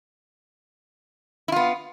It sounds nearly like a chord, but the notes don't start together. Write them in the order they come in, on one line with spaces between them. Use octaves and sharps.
E4 F4 B3